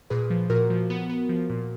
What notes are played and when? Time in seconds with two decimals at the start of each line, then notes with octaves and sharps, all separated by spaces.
0.10 A#2 G#4 B4
0.30 F3
0.50 A#2 F#4 A#4
0.70 F3
0.90 B3
1.09 B3
1.29 F3
1.50 A#2